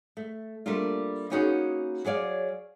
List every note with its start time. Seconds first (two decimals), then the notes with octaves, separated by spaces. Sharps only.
0.17 A3
0.66 G3 A3 A#3 D4 F4
1.30 A#3 B3 C#4 D#4 F#4 G#4
2.04 F#3 G#4 C#5 D5 F5